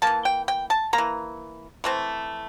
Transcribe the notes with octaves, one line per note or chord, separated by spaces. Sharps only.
E3 A#3 A5
G5
G5
A5
A#3 A#5
E3
E3 A3 C4